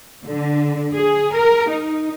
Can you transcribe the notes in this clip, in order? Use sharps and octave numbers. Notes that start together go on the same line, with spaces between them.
D3
G#4
A#4
D#4